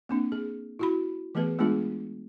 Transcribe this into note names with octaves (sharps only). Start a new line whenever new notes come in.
A#3 C4 D4
G#4
E4 F#4 B5
E3 A3 B3 G#4 B4
G#3 A3 B3 D4 F4 G#4